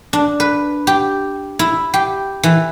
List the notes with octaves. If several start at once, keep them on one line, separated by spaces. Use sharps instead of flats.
D4
B4
G4
E4
G4
E3